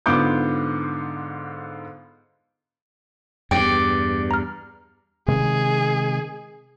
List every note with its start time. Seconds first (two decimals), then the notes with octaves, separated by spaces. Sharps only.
0.06 G#2 D3 B3 F4 D6 G6
3.51 E2 G2 D5 G5 D6
4.31 A#5 F6
5.28 C3 D#3 G#3 G#4